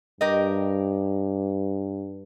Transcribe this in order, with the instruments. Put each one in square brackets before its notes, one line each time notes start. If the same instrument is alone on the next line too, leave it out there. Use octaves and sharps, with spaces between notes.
[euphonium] G2 [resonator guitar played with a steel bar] G4 A#4 D#5